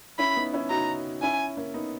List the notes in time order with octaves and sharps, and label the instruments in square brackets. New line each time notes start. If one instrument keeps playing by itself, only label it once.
[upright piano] C#4 E4 [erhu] B5
[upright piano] B3 D#4
C#4 E4
[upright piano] D#4 F#4 [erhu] A#5
[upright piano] C#4 E4 [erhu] G#5
[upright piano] A#3 C#4
B3 D#4